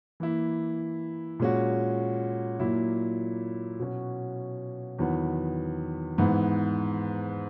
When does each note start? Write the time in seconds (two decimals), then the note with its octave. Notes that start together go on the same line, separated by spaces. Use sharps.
0.20 E3 A#3 E4
1.40 A#2 G#3 C#4 F#4
2.59 A#2 F#3 A#3 E4
3.79 B2 F#3 C#4 F#4
4.99 E2 D#3 F#3 B3
6.18 G#2 E3 B3 E4